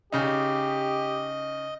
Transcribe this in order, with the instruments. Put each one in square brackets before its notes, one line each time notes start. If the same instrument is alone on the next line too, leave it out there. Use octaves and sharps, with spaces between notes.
[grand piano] C#3 D#4 [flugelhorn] G4 [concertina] D#5